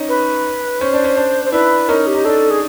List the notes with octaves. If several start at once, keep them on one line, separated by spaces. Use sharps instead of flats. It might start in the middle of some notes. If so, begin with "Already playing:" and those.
Already playing: C#4 D#4
B4
C#4 C5
D4
C#4
D4
C5
D4 E4 B4
C#4 D#4 A#4
G4
D#4
D4 A4
G#4